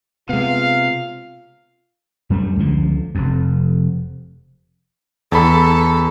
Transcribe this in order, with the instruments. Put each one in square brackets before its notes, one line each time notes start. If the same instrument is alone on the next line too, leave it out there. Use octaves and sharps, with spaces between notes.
[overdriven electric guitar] C3 [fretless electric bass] G#3 B3 [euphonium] F4 [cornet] F5
[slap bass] F#2 G3 A3
C#2 D3 F3
F1 F2
[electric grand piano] E2 B5 [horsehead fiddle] A4